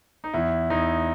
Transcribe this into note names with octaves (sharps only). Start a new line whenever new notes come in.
D#4
E2 E4
E2 D#4